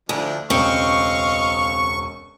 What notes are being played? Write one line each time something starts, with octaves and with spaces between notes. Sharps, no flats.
D2 F3 D4 E4
E1 C#2 C4 D#5 F5 C#6 G7